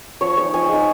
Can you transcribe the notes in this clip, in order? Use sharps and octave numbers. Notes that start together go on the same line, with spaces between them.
F3 C#5
G#3 D#4 C#5
F3 G#5
G#3 D#4